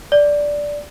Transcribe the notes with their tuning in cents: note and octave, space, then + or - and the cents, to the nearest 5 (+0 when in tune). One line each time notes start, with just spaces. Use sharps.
D5 -5